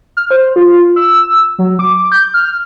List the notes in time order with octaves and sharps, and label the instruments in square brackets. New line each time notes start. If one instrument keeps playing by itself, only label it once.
[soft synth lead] F6
C5
F4
E6
F#3
D6
G6
F6